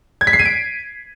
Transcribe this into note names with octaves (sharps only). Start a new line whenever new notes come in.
G#6
B6
C7
D#7
D7